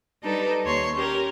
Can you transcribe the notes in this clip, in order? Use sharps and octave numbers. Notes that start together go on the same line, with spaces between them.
G3 D4 D#4 A4 B4
D#2 C#5 C6 C#6
C#4 G4 A#4